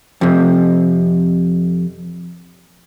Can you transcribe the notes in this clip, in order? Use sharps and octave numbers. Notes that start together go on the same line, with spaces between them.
F2 C3